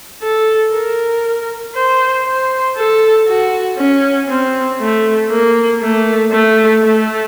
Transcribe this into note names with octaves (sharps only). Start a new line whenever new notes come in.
A4
A#4
C5
C5
A4
F#4
C#4
C4
A3
A#3
A3
A3
A3